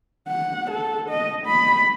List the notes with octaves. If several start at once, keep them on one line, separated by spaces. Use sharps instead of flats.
F#5
A4
D#5
B5